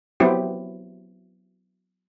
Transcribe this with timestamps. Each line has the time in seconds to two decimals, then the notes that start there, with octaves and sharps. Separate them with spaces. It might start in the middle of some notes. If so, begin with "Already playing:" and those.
0.20 F#3 B3 C4 E4 G4